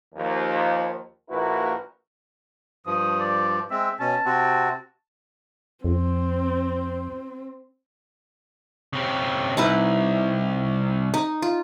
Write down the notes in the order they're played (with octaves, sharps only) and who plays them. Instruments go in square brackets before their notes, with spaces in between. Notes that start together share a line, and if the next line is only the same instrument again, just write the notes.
[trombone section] D#2 F3
A#1 A#3 E4 F#4 A#4 B4
[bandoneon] G2 F3 [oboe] D#6
[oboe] D5
[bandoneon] G#3 C4 [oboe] E5
[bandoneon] B2 C#4 [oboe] A5
[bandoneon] C3 C4 F#4
[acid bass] F2 [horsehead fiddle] C4
[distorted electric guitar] C#3 C4
[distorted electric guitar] C2 [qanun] D#4 E4 B4
[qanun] D#4
F4